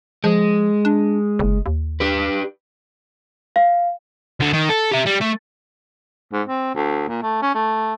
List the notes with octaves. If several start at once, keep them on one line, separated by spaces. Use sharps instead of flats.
F3 G#3
D4
F#1
D#2
D4 G4 B4
F5
D2 D3
D#3
A4
G4 E5
G3
A3
G#2
C4
D2
A#2
A3
C#4
A3